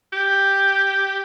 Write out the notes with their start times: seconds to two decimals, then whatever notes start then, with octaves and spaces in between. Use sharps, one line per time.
0.13 G4